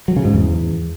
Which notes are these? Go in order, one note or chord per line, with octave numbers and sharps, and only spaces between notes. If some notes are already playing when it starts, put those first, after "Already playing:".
F#3
C#3
G#2
E2